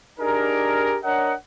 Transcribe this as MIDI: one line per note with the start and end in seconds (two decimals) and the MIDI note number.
0.19 0.96 62
0.19 0.96 63
0.19 0.96 67
0.19 0.96 68
0.19 0.96 70
1.04 1.34 62
1.04 1.34 70
1.04 1.34 73
1.04 1.34 75
1.04 1.34 78